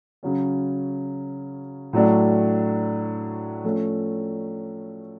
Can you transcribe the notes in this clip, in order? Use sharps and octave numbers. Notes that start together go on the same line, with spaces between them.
C#3 F#3 C#4
A2 F#3 A3 D4
F3 A3 C#4